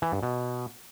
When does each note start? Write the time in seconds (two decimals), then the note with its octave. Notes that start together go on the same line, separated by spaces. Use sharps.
0.02 E3
0.12 G2
0.23 B2